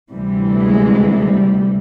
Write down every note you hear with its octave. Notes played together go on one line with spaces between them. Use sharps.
D2 C3 E3 G3
G#3
G3